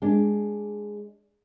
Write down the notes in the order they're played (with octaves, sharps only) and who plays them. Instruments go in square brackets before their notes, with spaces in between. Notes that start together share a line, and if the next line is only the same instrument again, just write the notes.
[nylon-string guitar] G#3 D4